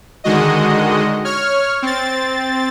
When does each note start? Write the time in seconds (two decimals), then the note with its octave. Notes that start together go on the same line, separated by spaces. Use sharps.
0.24 D3 D#3 G#3 F#4 D#5
1.25 C#5 F6
1.82 C4 A6